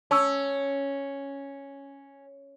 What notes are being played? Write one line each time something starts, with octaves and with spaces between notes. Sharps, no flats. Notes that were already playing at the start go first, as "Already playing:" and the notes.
C#4 A5 C#6 E6